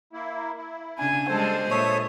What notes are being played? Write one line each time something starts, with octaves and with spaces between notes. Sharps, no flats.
A#3 E4
E4
C#3 D4 G#5
G3 G#3 G#4 A4 C5 A5
A#2 A4 C#5 E5 D#6